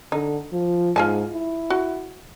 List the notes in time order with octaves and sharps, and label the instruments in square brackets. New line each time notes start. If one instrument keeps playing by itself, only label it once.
[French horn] D3 [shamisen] D#4
[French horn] F3
[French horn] G#2 [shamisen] F4 G#5 A5
[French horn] E4
[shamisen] F#4